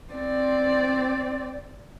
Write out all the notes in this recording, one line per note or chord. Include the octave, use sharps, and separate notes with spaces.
C4 D5